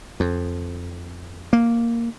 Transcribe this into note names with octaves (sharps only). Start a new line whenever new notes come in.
F2
A#3